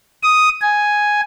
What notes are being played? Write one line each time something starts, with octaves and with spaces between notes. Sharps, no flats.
D#6
G#5